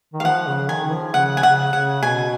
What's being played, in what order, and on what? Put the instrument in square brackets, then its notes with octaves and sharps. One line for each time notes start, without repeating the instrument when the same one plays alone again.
[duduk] D#3
[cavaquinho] F5
[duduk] F3 [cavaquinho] F#5
[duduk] C#3
[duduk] D#3 [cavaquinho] G#5
[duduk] F3
[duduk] C#3 [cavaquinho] F#5
[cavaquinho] G#5
[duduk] C#3 [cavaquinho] F#5
[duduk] C#3 [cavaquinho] F#5
[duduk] B2 [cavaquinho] G#5